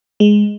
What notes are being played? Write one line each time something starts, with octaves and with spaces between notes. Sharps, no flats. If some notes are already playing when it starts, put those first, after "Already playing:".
G#3